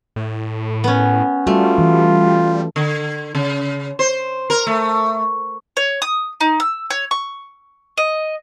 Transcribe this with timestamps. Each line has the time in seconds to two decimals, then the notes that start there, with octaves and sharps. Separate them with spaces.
0.16 A2
0.84 B3 C#4
1.47 G3 A3 F4 F#4
1.78 E3
2.76 D3
3.35 C#3
3.99 C5
4.50 A#4
4.67 A3
5.77 C#5
6.02 D#6
6.41 D#4
6.60 E6
6.90 C#5
7.11 C#6
7.98 D#5